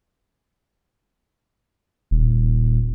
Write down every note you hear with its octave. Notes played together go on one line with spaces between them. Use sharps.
D#1